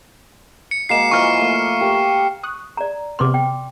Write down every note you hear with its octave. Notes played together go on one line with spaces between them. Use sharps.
C#7
G#3 A#3 F#4 C7 E7
E3 F3 A#3 C#6 F6
A3 A#3
G4 A#4
C#6 D#6 F#6
D5 A#5
C3 B3 C6 D6 F6
G5